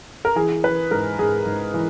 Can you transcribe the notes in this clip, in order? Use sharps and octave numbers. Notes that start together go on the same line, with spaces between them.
A#4
E3 G#4
E3 B4
G#2 A#4
G#2 G#4
G#2
E3